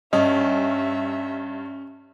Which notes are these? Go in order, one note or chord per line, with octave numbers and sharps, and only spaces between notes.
G2 C#4 D#5 E5